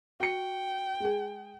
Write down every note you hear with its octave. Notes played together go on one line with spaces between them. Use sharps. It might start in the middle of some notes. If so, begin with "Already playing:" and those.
F#4 G5 C#7
G#3 G#4